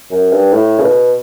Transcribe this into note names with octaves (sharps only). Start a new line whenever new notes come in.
F#2
G2
A2
C#3
B2